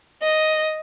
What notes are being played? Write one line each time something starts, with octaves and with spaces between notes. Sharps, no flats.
D#5